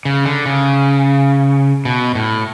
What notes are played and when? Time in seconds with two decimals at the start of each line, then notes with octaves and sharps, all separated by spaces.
0.05 C#3
0.25 D3
0.46 C#3
1.85 B2
2.15 A2